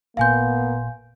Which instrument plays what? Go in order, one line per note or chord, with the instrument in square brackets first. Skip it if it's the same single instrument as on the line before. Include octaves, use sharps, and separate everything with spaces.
[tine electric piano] G#1 A#2 C6 [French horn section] A#3 B3 [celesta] F5 G#5 G6